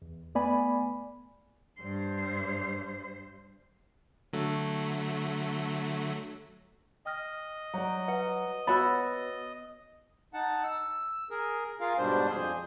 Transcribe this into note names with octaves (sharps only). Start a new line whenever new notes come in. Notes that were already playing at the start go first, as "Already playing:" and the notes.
E2
A3 B3 D5 G#5 B5
G2 C5
D3 F#3 A3
D#5 G5 F6 A#6
F#3 C#5 D5 A#5
B4 F#5
B3 F#4 C#5 B5 E6 F#6 A6
D#4 F#5 A5
E6
G#4 A#4
F4 G#4 A#4 F5
G#2 B2 G3 D4 C5 C6
F2 G#4 G6